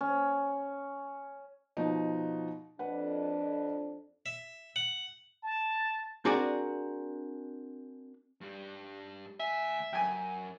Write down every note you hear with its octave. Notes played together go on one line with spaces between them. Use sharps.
C#4
B2 F3 D#4
F2 D4 B4 F#5
E5
F#5
A5
C4 D4 F#4 G#4 A#4 D5
G2 G3
D2 E5 G#5
F#2 G5 G#5